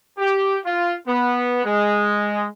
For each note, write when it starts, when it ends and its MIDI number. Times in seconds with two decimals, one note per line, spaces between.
0.18 0.57 67
0.65 0.93 65
1.07 1.63 59
1.65 2.45 56